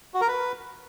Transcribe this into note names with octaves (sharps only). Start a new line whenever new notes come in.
F#4
A#4
B4